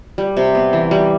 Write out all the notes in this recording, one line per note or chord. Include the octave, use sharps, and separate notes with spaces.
G3
C3
B3
E3
G3